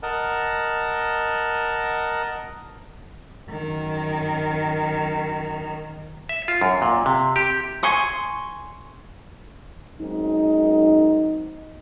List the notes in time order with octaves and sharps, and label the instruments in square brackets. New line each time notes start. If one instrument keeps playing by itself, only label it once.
[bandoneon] A#4 D#5 F#5 A5
[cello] F#2 D#3
[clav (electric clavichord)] E5
F4
F#2
A#2
C3
G4
[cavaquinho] G#5 C6 C#6 D#6
[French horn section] F#2 G#3 C4 D#4